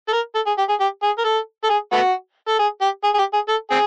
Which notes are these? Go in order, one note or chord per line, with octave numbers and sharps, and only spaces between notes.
A4
A#4
A4
G#4
G4
G#4
G4
G#4
A#4
A4
A4
G#4
A3 B3 F#4
A4
G#4
G4
G#4
G#4
G4
G#4
A4
C4 G#4